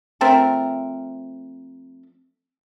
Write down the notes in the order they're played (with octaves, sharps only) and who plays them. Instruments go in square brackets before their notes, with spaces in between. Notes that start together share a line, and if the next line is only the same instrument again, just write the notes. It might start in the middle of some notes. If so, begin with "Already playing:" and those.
[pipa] F3 A3 C4 A#4